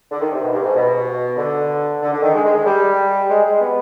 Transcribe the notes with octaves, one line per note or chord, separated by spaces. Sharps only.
D3
D#3
C3
B2
G2
G#2
B2
D3
D3
D3
D#3
G#3
G#3
G#3
G3
G#3
G#3
B3